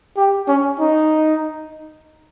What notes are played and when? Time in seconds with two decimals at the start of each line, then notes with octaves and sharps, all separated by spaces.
0.17 G4
0.48 C#4
0.79 D#4